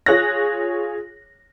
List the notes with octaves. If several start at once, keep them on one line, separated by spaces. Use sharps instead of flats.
F4 G#4 C#5 F#6 A#6